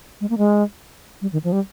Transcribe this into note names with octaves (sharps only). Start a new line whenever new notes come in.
G#3
A#3
G#3
G3
D#3
F3
G3